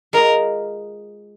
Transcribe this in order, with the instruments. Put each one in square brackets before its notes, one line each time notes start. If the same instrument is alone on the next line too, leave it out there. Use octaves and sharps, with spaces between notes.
[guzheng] G#3 F4 G#4 D#5 [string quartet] A#4